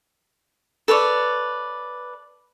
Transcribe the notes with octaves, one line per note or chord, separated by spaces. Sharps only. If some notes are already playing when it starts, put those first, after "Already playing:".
A4 B4 C#5 D5